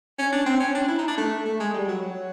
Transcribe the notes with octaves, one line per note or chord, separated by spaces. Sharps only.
C#4
D4
C4
C#4
D4
E4
D#4
D4
A3
A3
G#3
G3
F#3
F#3